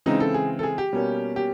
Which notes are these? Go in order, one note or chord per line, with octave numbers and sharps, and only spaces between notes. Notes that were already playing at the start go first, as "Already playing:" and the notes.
C#3 E3 G#3 C4 D#4
A4
G#4
A4
G#4
G4
B2 G3 A#3 C#4
G4